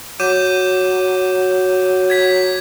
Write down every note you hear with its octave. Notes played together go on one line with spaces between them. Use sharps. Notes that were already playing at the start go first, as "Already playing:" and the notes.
F#3 D6 G6 D#7
G#6 B6